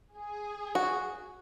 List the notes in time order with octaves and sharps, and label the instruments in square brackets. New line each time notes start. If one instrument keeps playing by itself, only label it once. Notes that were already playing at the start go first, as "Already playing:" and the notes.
[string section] G#4
[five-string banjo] F#4